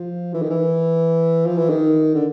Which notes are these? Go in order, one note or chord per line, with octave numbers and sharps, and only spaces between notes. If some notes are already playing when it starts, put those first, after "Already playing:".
Already playing: F3
E3
D#3
E3
F3
E3
D#3
D3